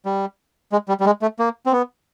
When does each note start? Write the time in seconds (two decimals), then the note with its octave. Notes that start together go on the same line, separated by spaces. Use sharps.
0.05 G3
0.72 G#3
0.88 G3
1.00 G3
1.06 G#3
1.22 A3
1.39 A#3
1.66 C4
1.72 B3